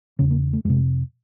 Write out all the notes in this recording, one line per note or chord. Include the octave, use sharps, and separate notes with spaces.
E2 C#3 C#4
A#3
A3
F2 C3 G#3